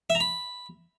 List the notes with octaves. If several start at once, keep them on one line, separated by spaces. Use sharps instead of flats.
E5
A#5
B5